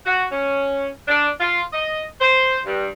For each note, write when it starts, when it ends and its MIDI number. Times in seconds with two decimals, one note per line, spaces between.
0.06 0.25 66
0.32 0.88 61
1.08 1.28 62
1.40 1.62 65
1.72 2.02 75
2.21 2.58 72
2.66 2.88 43